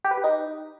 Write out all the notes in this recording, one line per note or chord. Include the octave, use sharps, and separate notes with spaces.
G4
B4
G4
D#4